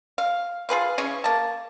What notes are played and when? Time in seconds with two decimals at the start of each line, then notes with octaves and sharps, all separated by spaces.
0.18 F5
0.69 F4 G#4 B4 F5
0.98 C#3 E3 C#4
1.24 A#3 A5